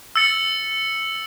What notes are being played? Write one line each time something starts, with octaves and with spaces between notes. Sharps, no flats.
E6 A6 C#7 F#7